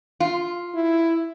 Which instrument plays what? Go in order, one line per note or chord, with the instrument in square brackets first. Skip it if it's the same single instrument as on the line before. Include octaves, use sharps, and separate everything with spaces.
[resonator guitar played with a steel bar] F4
[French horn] E4